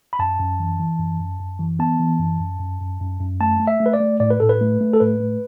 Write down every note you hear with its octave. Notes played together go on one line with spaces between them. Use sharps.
B5
F#2 A5
F#2
E3
E3
F#2
F#2
F#2
E3
B3 A5
E3
F#2
F#2
F#2
F#2
F#2
F#2
A3 A5
A3
E5
A3
B4
D5
A3
A2 D5
B4
A2 A4
B4
A3
A3
A4
A2 B4
A3